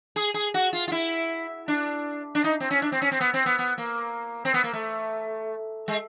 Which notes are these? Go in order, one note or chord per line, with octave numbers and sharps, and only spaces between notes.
G#4
G#4
F#4
F4
F4
E4
D4
D4
D#4
C4
C#4
D4
C4
C#4
C4
B3
C4
B3
B3
A#3
C4
B3
A#3
A3
G#3